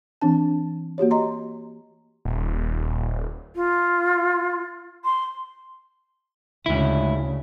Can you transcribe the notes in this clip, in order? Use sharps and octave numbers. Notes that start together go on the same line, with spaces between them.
E3 C4 D4 A5
A#3 F#4 G4 C#5
D#5 A#5 C6
D#1
F4
C6
D2 G#2 C#3 E4